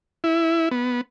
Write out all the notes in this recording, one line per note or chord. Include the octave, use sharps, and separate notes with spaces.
E4
B3